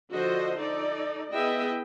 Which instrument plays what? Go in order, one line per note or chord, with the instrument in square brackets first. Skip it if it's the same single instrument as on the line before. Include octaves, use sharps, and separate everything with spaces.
[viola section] D3 F3 F#4 A4 C5 D#5
D#4 A4 D5
B3 E4 G#4 D#5 E5 G5